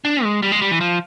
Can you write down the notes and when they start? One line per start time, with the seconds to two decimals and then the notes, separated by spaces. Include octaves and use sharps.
0.05 D4
0.24 G#3
0.42 G3
0.52 G#3
0.62 G3
0.71 E3
0.81 F3